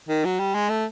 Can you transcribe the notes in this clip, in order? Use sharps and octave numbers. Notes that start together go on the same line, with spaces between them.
D#3
F#3
G3
G#3
A3